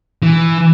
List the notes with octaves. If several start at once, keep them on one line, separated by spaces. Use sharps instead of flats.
E3